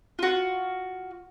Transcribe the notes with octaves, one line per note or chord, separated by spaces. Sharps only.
F4 F#4